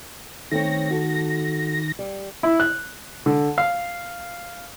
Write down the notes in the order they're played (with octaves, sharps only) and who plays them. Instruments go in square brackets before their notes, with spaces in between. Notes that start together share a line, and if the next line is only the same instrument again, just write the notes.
[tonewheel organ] D#3 A#6 [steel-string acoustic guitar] A3 C4 C#5
[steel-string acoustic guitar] F#4 A4
G3
[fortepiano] E4
F#6
D3
F5